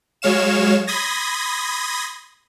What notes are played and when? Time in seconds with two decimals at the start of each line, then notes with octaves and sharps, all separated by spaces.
0.22 F#3 G#3 C#5 F5 E7
0.87 B5 C6 D#6 G#6 A#6